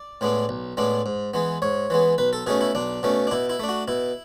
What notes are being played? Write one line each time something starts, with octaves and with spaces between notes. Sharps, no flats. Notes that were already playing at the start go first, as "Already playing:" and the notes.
Already playing: D5
A2 G#3 B3 D4
B1
A2 G#3 B3 D4
G#2
E3 G#3 B3
G#2 C#5
E3 G#3 B3
B1 B4
A4
B2 A3 C#4 G#4
E4
B1 D4
B2 A3 C#4
D4
B2 E4
E4
A3 D4
F#4
B2 E4